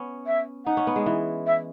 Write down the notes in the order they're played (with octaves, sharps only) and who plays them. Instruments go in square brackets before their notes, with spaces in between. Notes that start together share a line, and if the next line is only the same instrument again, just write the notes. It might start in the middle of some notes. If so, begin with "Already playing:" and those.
Already playing: [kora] B3 C#4
[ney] E5
[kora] D#4 [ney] F#5
[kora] C#4
B3
G#3
E3
[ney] E5